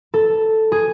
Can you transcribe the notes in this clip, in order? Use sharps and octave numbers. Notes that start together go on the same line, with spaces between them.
A4
G#4